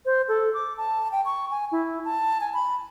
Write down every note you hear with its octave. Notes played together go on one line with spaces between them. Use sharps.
C5
A4
D6
A5
G5
C#6
G#5
E4
A5
G#5
B5